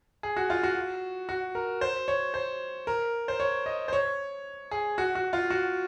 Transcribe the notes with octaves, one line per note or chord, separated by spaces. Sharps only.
G#4
F#4
F4
F#4
F#4
A#4
C5
C#5
C5
A#4
C5
C#5
D#5
C5
C#5
G#4
F#4
F#4
F4
F#4